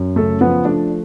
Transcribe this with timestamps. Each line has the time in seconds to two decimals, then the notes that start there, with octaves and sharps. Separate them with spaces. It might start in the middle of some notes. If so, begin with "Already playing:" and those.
Already playing: F#2
0.16 C#3 A3 A4
0.41 F3 B3 B4
0.65 A3 D4 D5